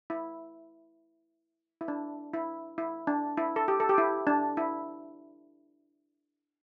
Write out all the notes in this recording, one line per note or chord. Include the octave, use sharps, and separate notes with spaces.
E4
E4
D4
E4
E4
D4
E4
A4
G4
A4
G4
E4
D4
E4